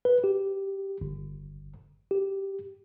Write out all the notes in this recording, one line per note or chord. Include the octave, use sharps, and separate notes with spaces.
B4
G4
G1
G4